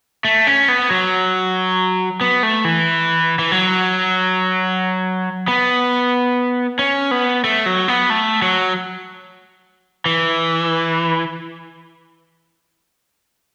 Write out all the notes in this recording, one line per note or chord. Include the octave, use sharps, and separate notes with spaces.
A3
C#4
B3
F#3
B3
A3
E3
E3
F#3
B3
C#4
B3
A3
F#3
B3
A3
F#3
E3